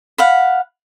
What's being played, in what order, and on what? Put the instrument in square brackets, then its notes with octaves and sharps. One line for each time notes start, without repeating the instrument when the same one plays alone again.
[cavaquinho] F5 F#5 B5